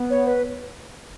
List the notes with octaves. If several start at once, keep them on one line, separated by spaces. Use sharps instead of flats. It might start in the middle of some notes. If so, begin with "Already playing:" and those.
Already playing: B3
C#5
B4